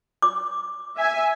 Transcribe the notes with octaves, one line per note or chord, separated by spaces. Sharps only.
D6
E5 G#5